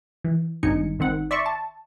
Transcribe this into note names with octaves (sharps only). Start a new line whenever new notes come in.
E3
G#1 G2 D#4 G#5 C#7
G#1 D#3 C4 F#5
D5 E5 C6 C#6
A5